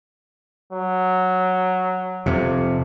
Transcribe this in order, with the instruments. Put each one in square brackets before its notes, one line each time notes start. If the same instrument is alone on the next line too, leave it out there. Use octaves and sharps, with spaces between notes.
[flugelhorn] F#3
[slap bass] F2 C3